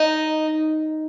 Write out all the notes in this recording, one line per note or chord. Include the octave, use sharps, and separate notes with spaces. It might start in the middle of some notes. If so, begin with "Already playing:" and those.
Already playing: D#4